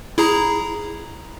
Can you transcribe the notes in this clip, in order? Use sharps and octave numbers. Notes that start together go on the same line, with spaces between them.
E4 G#4 A#5